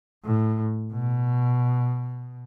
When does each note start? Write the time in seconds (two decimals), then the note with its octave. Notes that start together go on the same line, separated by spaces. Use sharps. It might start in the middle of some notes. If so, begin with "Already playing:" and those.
0.25 A2
0.93 B2